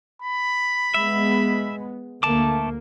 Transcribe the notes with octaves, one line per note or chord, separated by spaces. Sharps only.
B5
G#3 B3 E5
D2 A3 A#3 A5 D6